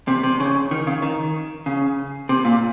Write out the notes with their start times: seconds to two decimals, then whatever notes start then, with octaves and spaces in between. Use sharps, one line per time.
0.08 C3
0.23 C3
0.40 C#3
0.71 D#3
0.87 C#3
1.02 D#3
1.66 C#3
2.29 C3
2.45 A#2